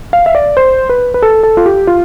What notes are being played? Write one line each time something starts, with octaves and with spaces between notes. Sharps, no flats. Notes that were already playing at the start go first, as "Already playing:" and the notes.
F5
E5
D5
C5
B4
B4
A4
A4
F4
G4
F4